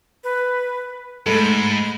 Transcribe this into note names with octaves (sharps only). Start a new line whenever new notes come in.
B4
G#2 G#3 A3 A4 B5